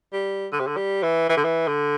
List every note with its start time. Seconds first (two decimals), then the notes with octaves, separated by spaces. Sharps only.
0.12 G3
0.52 D3
0.60 C3
0.67 D3
0.77 G3
1.02 E3
1.29 E3
1.36 D3
1.44 E3
1.68 D3